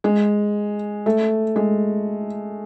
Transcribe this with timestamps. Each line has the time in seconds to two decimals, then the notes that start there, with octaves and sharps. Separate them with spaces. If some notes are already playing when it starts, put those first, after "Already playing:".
0.04 G#3
1.06 A3
1.56 G#3